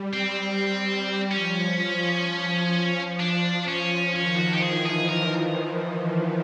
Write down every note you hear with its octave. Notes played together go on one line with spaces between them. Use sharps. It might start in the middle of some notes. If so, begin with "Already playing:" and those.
Already playing: G3
C4
F3 C#4
D4
C#4
D#3 C#4
F4
F#4
G4
E3 G#4
G#4
A#4